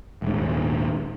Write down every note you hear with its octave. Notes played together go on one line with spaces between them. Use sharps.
D#1 G#2